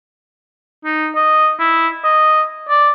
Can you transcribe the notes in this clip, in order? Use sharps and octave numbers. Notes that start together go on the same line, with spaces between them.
D#4
D#5
E4
D#5
D5